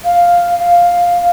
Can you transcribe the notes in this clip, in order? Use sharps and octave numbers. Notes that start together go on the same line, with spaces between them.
F5
F5